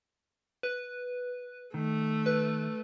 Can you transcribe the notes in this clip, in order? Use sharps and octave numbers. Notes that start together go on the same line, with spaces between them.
B4
D#3 A3
B4